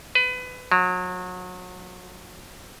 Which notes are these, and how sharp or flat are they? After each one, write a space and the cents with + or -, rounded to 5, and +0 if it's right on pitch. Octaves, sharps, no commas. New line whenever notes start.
B4 +25
F#3 -30